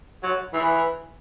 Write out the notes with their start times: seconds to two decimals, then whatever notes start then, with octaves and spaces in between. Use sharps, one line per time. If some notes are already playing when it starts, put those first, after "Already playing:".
0.23 F#3
0.53 E3